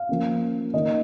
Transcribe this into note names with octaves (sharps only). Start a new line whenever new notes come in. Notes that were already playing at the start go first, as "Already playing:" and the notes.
Already playing: F5
F3 A#3 C#4
D#3 A#3 D#4 D#5